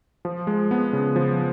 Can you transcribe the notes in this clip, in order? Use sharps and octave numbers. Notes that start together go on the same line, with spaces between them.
F3
G#3
B3
C#3
F3